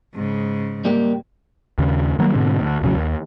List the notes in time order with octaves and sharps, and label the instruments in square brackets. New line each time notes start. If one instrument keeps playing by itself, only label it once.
[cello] G#2 C#3
[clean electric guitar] G3 A#3 G4
[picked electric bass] D#2 C#3
D#3 F#3 G3 A#3
G#2 B2 D3 C4
D2
E1 A1 C#3 F#3
D#2